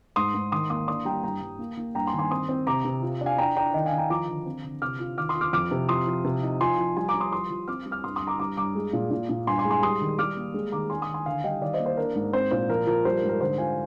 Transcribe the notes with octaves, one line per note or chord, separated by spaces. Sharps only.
G#2 C6 D#6
G#2
D#3 C6 D#6
A#3 C6 D#6
D4 C6 D#6
G3 G5 A#5
G2 G5 A#5
G2
A#3
A#3
G2 G5 A#5
G#5 C6
D#3
G#5 C6
C4 C6 D#6
C4
C3 A#5 D6
C3
F4
D4
F5 G#5
D4 G5 A#5
D4 G5 A#5
D#3 D#5 G5
F5 G#5
D#3
G5 A#5
F3 A#5 D6
D3
C4
D3
C3 D6 F6
F4
D#3 D6 F6
C6 D#6
F4
D6 F6
F2 D6 F6
C3
F3 C6 D#6
F3
C3
D#4
F3 G#5 C6
F3
G3 G#5 C6
A#5 D6
G3
C6 D#6
F3 C6 D#6
F3
C4 D6 F6
G3
D6 F6
G2 C6 D#6
C6 D#6
G2
A#5 D6
G3 A#5 D6
G2 A#5 D6
G#3
A#2
A#2
A#2
G2 G#5 C6
G#5 C6
G#3
G#5 C6
G3 C6 D#6
D#3
G3 D6 F6
A#3
G#3
D#3 A#5 D6
D4 G#5 C6
C6 D#6
D#3
G#5 C6
D3 F5 G#5
G3 D#5 G5
D#3 D5 F5
C5 D#5
A#3
C5
D4 A#4
G#2
C4 C5
A#2 C5
F3 A#4
F3 A#4
G3 C5
A#4
G#2
A#4
D3 C5
F4 F5 G#5